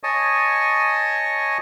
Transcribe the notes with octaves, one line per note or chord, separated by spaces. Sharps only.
C#5 D#5 G#5 A5 C#6 D#6